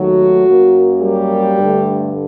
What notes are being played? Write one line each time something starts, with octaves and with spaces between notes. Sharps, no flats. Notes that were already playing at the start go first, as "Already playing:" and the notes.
Already playing: D#2 D#3 F#3 A3 F#4
F#2 F#3 A#3
G3 G4
G2 D3 A3